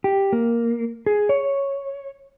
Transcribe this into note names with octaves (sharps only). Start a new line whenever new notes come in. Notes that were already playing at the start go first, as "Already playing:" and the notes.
G4
A#3
G#4
C#5